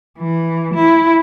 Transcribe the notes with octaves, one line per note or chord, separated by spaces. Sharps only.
E3
E4